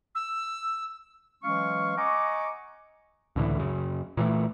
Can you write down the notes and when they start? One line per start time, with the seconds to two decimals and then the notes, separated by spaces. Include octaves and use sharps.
0.15 E6
1.43 E3 F#3 G#3 C#4 F5 C#6
1.98 D#5 F#5 G#5 A#5 C#6 D6
3.36 C#2 A2 D3 E3
3.59 F#2 C#3
4.17 A#2 E3 F#3 A3